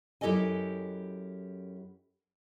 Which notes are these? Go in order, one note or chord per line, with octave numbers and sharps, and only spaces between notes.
F#2 E4 G4 A4 D#5 G#5